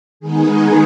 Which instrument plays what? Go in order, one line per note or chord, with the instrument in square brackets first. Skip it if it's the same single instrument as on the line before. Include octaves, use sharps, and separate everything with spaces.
[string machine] D#3 G#3 B3 D#4 G#4